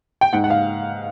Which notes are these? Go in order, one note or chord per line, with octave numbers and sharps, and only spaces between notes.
G5
G#2 F#5
F#5
F5